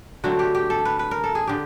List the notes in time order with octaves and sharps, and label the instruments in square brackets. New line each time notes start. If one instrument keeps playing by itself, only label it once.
[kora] D3 F#3 A3 C4 F#4
G4
G4
A4
B4
B4
A#4
A4
G#4
D3 G4